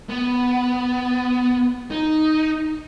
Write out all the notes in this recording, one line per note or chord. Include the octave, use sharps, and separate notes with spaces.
B3
D#4